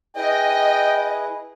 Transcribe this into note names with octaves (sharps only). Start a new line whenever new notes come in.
E4 G#4 B4 D#5 G5